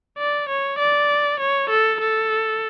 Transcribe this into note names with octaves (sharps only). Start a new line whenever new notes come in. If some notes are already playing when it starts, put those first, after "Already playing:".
D5
C#5
D5
C#5
A4
A4